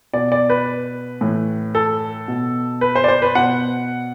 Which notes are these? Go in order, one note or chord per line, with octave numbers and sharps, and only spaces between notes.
B2 D5
D5
B4
A2 E3
A4
B2
B4
C5
D5
C5
B4
B2 F#5